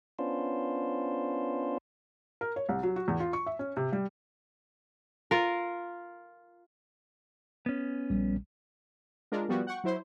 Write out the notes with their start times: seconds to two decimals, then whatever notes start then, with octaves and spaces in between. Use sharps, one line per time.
0.19 B3 C#4 D4 F4 C5
2.41 A#4
2.56 C#5
2.69 C2
2.83 F#3
2.96 F#4
3.08 E2
3.20 F4
3.33 C#6
3.46 E5
3.59 C#4
3.77 C3
3.92 G3
5.31 F4 A#4
7.66 B3 C#4
8.10 A#1 G3
9.32 G#3 D4 F4 A#4
9.48 F3 G3 B3 F#4
9.67 F#5 G5 C#6
9.84 F#3 E4 C5